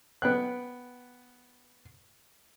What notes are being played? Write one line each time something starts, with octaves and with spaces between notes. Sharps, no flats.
B3 G5 F#6